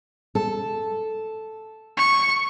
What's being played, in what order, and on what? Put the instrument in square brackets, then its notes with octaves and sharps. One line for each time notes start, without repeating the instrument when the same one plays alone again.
[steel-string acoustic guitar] A4
[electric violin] C#6